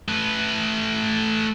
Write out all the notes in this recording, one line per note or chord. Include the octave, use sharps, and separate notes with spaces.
A3 B4